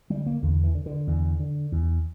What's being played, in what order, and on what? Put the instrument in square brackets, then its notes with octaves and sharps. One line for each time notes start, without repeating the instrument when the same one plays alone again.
[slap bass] D3 G3
A#3
E2 D3
E3
D3
D3
E2
D3
E2